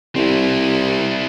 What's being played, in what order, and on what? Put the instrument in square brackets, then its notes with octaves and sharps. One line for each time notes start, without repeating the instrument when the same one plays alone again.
[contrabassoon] C2 [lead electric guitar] C4 E4